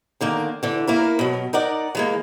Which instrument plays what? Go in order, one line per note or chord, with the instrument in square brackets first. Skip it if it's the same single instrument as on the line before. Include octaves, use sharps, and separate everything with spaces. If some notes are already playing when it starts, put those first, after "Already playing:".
[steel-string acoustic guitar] D3 D#3 A#3
D3 E3
A#3 E4 A#4
B2 F#3
D#4 A#4 D5 F#5
E3 G#3 A#3